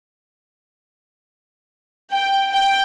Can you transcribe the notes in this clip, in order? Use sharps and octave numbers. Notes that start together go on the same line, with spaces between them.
G5
G5